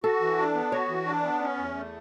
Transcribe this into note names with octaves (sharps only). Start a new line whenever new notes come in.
F#4 A4
E3
D4
B3
F#4 C#5
E3
D4
B3
C#4
E2
A3